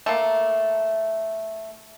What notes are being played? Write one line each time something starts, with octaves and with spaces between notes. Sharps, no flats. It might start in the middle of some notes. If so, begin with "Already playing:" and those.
A3 A#3